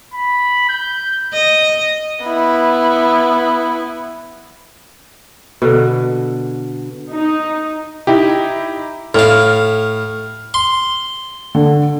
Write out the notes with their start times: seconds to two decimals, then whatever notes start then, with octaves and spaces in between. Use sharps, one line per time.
0.14 B5
0.69 G6
1.33 D#5
2.25 B3 E4
5.62 B2 D3
7.12 D#4
8.07 D#4 E4 G4
9.15 A2 F5 F6
10.54 C6
11.55 D3